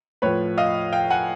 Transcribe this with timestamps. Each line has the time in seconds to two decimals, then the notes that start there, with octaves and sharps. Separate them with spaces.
0.22 A2 F3 B4 C#5
0.58 D#5 F5
0.93 F5 G5
1.10 F#5 G#5